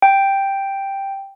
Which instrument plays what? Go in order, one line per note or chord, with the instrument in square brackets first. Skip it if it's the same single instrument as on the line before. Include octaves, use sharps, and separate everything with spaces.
[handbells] G5